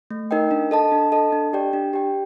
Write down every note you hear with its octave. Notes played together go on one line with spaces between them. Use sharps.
A3
D#4 A#4 D#5 G5
D4
A4 D#5 A5
D4
A4 D#5 A5
D4
G4 D5 G5
D4
G4 D5 G5